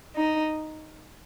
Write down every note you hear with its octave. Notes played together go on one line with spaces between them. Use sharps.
D#4